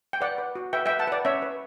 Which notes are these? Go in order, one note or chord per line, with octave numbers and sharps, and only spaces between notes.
G5
B4 D5 F#5
B4
F#4
B4 E5 G5
B4 E5 G5
F#5 A5
B4 D5
C#4 C#5 E5
B4